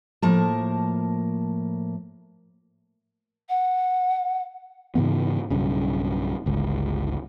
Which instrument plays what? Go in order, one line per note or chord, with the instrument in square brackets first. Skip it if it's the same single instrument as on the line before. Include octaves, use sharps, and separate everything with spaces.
[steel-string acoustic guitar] A2 F3 A#3 A#4 A5
[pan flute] F#5
[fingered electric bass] G#2 C#3 E3 B3
B1 G2 C#3
G1 C#2